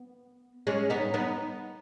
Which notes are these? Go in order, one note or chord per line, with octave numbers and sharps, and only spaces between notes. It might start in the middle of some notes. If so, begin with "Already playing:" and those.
Already playing: B3
G#3 C#4
B3 D#4
B3 D#4